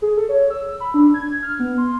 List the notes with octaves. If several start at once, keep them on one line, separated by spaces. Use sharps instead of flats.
G#4
A4
C#5
E6
B5
D4
G#6
F6
B3
C6